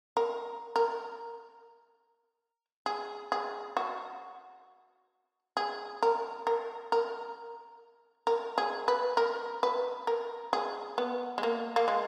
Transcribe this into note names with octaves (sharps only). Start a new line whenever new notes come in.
A#4
A#4
G#4
G#4
F#4
G#4
A#4
A#4
A#4
A#4
G#4
B4
A#4
B4
A#4
G#4
B3
G#3
A#3
A#3
G#3